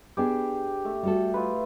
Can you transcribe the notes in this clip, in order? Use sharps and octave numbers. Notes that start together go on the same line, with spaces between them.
B3 D4 G4 G#4
A3
G3 F#4 A4
E4 F4 B4